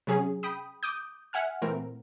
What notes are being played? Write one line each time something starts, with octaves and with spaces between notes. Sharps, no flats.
C3 F#3 C#4 G#4
G5 B5 D#6
D6 D#6 G6
E5 F#5 G#5 F6
A#2 E3 A3 C4 A#4